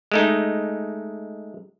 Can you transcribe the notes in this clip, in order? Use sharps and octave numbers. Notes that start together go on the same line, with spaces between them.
G#3 A3 D#4